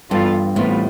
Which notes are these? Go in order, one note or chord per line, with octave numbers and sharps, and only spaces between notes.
G2 E3 B3 F4 A4
A2 C3 E3 G3 B3 F4